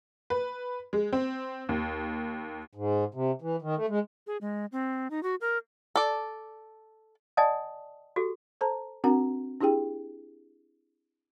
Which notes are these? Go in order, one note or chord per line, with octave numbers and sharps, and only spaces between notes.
B4
G#3
C4
D#2
G#2
C3
E3
D#3
A3
G#3
G#4
G#3
C4
D#4
F#4
A#4
A4 D5
D5 D#5 F#5 G#5 A5 D#6
F#4 G4 A4
A4 C5 A5 A#5
C4 D4 F#4 A#4 F#5 A#5
D4 E4 G4 G#4 G5